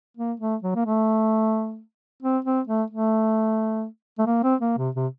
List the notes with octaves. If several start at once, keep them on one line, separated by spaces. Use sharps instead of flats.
A#3
A3
F#3
A#3
A3
C4
C4
A3
A3
A3
A#3
C4
A#3
C3
C3